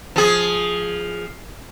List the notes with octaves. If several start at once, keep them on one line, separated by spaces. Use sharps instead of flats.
F3 G#4